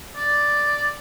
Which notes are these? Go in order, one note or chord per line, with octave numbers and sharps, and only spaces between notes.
D5